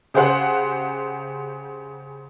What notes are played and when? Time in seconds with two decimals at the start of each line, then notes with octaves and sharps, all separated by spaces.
0.14 C#3 G4 G#4 C5 F#5 F#6